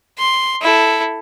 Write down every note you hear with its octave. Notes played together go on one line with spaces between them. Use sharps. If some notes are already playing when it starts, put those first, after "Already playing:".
C6
E4 A4